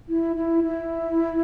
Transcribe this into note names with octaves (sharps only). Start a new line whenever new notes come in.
E4
E4
E4